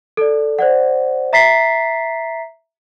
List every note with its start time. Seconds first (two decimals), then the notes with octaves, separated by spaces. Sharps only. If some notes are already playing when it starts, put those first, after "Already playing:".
0.17 A4 D5
0.59 C5 D5 F#5
1.33 E5 A#5 A6 B6 C7